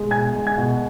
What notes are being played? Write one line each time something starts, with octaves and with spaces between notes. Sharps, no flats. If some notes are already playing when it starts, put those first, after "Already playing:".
Already playing: B2 G#3
B2 G#5 G#6
G#3
G#5 G#6
B2